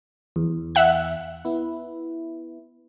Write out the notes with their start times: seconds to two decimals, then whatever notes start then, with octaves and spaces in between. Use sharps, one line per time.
0.36 E2
0.75 E5 F#5 F#6
1.45 B3 E4